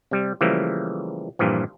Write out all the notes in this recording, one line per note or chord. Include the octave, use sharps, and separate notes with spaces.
C3 G3
C#3 E3 F3 G3 A3 A#3
G2 A#2 E3 F3